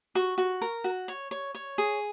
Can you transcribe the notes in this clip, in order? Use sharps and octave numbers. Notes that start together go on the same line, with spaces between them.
F#4 C#6
F#4
A#4
F#4
C#5
C#5
C#5
G#4